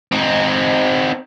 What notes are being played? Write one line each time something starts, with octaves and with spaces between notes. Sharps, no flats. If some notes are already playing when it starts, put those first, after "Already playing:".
C4 D#4